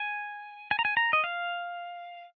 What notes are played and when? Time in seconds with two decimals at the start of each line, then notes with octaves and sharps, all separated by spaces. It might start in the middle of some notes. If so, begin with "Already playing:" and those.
Already playing: G#5
0.71 G#5
0.79 A#5
0.85 G#5
0.97 A#5
1.13 D#5
1.24 F5